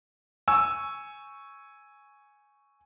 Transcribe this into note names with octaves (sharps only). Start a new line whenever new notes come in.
G#5 C#6 E6